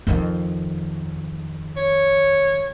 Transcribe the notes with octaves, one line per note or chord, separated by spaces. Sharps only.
F2 D#3
C#5